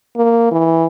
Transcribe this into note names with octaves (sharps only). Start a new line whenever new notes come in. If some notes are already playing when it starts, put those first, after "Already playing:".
A#3
E3